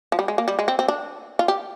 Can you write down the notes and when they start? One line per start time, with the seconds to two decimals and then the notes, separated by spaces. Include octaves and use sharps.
0.12 F3
0.19 G3
0.28 G#3
0.38 A#3
0.48 G3
0.59 G#3
0.68 C4
0.79 C4
0.88 D4
1.39 F4
1.48 G4